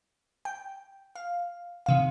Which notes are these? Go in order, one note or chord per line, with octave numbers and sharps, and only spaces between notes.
G5
F5
C3 D#3 F5